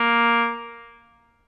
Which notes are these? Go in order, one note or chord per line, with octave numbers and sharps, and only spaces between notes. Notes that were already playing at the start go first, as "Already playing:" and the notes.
Already playing: A#3